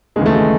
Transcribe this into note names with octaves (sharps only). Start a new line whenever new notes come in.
D#2 C#3 E3 G#3
A3
G#3